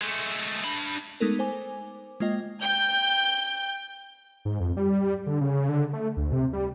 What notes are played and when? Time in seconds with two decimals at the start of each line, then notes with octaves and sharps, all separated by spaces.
0.01 G#3 A3
0.64 D4 B5
1.20 G#3 A3 B3 D#4 A4 A#4
1.39 C5 G#5 D6
2.20 G#3 A#3 F4 D#5 G5
2.61 G5 G6
4.45 G#2
4.60 F2
4.77 G3
5.26 D3
5.41 C#3
5.69 D3
5.93 A3
6.17 D2
6.33 C3
6.53 G3